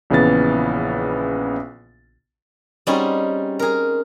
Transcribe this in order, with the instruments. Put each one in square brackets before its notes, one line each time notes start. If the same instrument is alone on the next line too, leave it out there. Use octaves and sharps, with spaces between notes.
[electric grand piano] A#1 C#3 E3 B3 A6
[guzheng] G3 C4 C#4 D#4 F#4 G#4
G#4 A#4